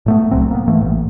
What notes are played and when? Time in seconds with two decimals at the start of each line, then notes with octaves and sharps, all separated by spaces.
0.06 A2 A3 B3
0.31 D1 C2 F#3 C4
0.51 A#3 B3
0.68 G#2 E3 A3 A#3
0.81 A1